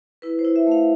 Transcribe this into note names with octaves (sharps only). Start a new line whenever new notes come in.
E4 B4
C5
E4
E5
A3 F5